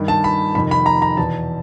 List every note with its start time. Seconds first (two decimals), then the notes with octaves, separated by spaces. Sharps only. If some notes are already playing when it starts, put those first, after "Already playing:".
Already playing: G2 D#3
0.08 A5
0.24 B5
0.55 F2 C3 D#3 B5
0.71 B5
0.86 A#5
1.02 A#5
1.17 E2 B2 A5